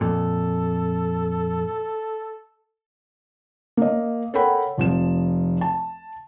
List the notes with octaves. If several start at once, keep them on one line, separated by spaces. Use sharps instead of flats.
F2 A#2 A4
A#3 D#5
A4 A#4 C#5 F#5 G5 B5
F1 F3 E7
A5